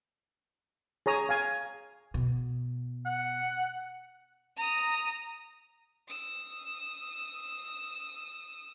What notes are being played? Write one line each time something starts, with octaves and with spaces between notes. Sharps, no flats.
G#4 C#5 A#5 D#6
F5 G#5
B2
F#5
A#5 D#6
D#6 E6